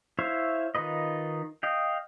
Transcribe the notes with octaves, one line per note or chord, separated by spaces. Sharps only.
E4 C5 C#5 E5 F5
D#3 D#4 F4 B4 D#5
D#5 F5 G5